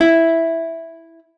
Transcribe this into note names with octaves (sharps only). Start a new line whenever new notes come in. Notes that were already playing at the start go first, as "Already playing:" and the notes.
E4